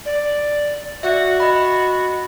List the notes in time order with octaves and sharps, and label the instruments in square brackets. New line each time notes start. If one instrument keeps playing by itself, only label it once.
[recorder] D5
[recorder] F#4 [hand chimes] D5 E5
[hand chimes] D#5 B5